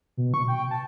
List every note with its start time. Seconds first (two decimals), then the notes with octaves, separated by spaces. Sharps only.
0.17 B2
0.34 C#6
0.48 G5
0.71 A5